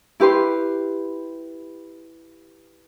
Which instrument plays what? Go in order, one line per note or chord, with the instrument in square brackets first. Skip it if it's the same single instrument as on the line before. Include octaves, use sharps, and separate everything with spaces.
[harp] E4 G4 B4 C6